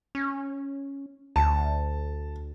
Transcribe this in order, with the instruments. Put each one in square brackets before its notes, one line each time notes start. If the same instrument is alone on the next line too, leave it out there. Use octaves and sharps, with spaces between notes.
[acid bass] C#4
[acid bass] D2 [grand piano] A5